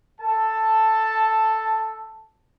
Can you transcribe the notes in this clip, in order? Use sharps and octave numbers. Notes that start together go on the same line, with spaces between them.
A4 A5